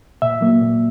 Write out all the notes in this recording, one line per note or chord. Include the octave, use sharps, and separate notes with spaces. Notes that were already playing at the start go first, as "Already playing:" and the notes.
A#2 E5
F#3 A#3
A#2